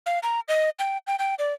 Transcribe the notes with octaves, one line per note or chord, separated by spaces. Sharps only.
F5
A#5
D#5
G5
G5
G5
D5